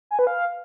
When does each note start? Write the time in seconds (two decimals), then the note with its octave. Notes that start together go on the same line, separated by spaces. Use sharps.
0.11 G#5
0.19 B4
0.27 F5